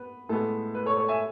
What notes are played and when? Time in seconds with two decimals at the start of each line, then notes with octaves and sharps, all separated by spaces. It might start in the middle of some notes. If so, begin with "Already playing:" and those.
Already playing: B3 B4
0.29 A2 G#3 B3 A4
0.75 B4
0.86 A4 C#5
0.97 A4 C#5
1.08 E5 G#5